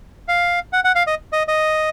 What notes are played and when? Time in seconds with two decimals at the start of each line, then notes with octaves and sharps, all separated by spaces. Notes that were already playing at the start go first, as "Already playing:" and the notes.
0.28 F5
0.73 F#5
0.84 F#5
0.95 F5
1.07 D#5
1.33 D#5
1.48 D#5